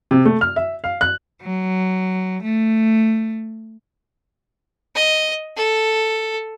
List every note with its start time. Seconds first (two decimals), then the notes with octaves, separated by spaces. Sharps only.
0.11 C3
0.25 A3
0.41 F6
0.56 E5
0.84 F5
1.01 F#6
1.41 F#3
2.44 A3
4.95 D#5
5.57 A4